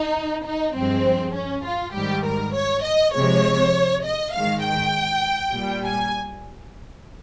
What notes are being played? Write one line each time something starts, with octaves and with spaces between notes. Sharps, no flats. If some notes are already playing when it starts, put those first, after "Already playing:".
Already playing: D#4
D#4
G2 F3 G#3 C4
C#4
F4
G#2 D#3 G3 G4
A#4
C#5
D#5
C3 F3 G#3 C#5
D#5
G#2 D#3 G#3 F5
G5
A#2 G3
G#5